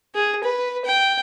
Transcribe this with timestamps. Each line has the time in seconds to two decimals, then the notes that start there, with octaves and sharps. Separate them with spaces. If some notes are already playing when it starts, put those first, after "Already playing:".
0.15 G#4
0.44 B4
0.85 G5